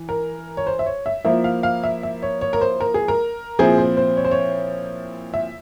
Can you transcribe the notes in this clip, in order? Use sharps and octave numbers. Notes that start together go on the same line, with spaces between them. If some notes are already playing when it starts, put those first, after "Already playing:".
Already playing: E3
A#4
C#5
C5
E5
C#5
E5
F3 A#3 E4 E5
F5
F5
E5
E5
C#5
C#5
A#4
C5
A#4
G#4
A#4
A#2 F3 C4 E4 G#4
C5
C5
C#5
C5
C#5
E5